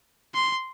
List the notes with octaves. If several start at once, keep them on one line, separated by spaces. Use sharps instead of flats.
C6